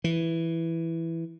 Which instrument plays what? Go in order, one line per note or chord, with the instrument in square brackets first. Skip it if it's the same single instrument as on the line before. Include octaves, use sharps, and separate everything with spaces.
[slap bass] E3